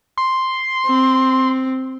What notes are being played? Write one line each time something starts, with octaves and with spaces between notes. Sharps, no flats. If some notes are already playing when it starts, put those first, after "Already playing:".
C6
C4